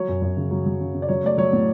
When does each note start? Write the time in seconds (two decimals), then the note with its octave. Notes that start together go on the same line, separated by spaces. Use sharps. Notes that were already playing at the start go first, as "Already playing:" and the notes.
Already playing: F#3 C#5
0.08 F#2
0.22 F#2
0.37 C#3
0.51 F#3
0.66 F#3
0.80 C#3
0.94 C#3
1.02 D5
1.09 F#3 C#5
1.24 A3 D5
1.38 F#3 C#5
1.53 A2